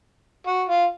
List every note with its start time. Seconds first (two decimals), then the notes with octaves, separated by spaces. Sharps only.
0.47 F#4
0.69 F4